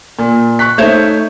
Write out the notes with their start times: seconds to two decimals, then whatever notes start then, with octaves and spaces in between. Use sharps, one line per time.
0.19 A#2
0.59 C#6 F#6 B6
0.78 A3 D#4 C5 C#5 E5